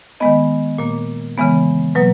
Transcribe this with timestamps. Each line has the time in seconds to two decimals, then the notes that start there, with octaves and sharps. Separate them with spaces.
0.20 D#3 G#3 B3 D#5
0.78 A#2 A#3
1.37 C#3 E3 G#3 B3
1.95 B2 F#3 A#3 B4